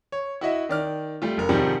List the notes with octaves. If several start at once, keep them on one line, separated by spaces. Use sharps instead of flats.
C#5
E4 F#4 D#5 E5
D#3 D5 F6
G3 A3 F4
F#1 A#4
G#2 C3 D#3 F3 G3